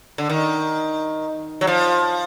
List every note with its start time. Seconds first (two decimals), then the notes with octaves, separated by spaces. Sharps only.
0.18 D3
0.30 D#3
1.61 F#3
1.67 F3